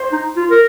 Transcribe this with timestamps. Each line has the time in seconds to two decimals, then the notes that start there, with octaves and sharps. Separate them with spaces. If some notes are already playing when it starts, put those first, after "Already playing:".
Already playing: C5
0.12 D#4
0.37 F4
0.51 A#4